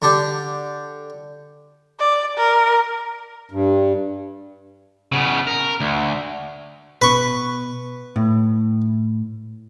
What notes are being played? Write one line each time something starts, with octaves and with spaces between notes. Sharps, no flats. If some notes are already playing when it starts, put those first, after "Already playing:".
D3 D4 G4
D5
A#4
G2
C#3 B3
A#4
D2
B2 B4 C#6
A2